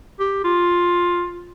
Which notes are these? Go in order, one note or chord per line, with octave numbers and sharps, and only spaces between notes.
G4
F4